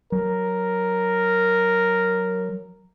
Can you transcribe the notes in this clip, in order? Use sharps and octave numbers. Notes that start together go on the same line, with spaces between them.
F#3 A#4